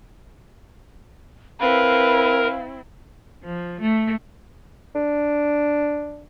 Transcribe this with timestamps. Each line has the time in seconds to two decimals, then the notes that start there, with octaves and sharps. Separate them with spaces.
1.61 C4 E4 A#4 B4 F5
3.44 F3
3.81 A3
4.95 D4